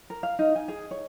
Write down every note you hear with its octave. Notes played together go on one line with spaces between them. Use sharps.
A#4
F5
D#4
G#5
G#4
C#5